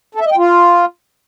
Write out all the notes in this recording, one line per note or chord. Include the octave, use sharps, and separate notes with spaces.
A4
E5
D#5
G5
F4